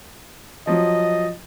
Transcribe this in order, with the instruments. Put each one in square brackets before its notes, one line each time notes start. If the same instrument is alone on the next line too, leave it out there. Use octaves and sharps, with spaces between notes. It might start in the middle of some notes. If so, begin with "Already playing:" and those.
[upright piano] F3 F#3 [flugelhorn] D#5